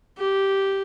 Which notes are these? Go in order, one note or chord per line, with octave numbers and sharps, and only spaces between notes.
G4